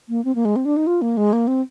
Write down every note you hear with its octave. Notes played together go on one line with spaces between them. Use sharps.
A#3
C4
A#3
G#3
C4
D4
D#4
F4
A#3
G#3
A#3
C4